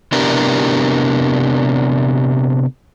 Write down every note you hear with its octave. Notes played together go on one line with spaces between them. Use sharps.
C3 B3 D4 E4 G4 A#4